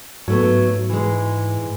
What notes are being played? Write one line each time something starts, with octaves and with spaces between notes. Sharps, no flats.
G#2 F#3 A3 B3
E3 G#3